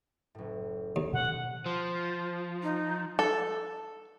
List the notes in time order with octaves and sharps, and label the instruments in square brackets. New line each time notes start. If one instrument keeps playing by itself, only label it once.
[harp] F#1 A2
[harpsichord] D#2
[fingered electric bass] B2 D#3 [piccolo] F#5
[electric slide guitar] F3 [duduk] C5
[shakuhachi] D#4
[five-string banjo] A4